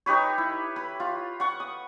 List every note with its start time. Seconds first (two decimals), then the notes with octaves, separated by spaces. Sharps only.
0.06 D#4 G4 B4 C#5
0.38 E4
0.76 B4
1.00 F4
1.40 F#5 C#6
1.60 D#6